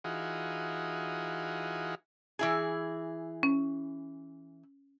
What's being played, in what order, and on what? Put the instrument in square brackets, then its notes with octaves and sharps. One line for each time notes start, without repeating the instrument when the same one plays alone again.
[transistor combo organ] E3 D#4 F4 F#4 G#4
[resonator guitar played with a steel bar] E3 E4 G#4
[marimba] C#4